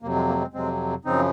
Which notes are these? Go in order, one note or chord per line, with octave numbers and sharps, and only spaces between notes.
F2 C3 F#3 A#3
G#3
A#3
G#3 C4
F2 C3 F#3 G#3 C4
F#2 C#3 F3 C4 D#4